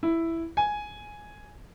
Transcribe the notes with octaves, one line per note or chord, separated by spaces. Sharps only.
E4
G#5